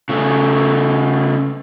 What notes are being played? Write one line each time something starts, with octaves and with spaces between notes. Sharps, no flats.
C#3 A3